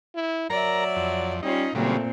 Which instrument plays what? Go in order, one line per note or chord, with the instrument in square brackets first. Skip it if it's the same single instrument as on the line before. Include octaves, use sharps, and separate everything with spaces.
[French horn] E4
[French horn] F#3 [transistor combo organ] A#4 A#5 [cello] D5 E5
[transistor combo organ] F2
[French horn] G3 [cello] C#4 F4 [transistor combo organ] D#4
[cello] A#2 C4 [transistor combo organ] C#3 F#3 G3 [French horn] A3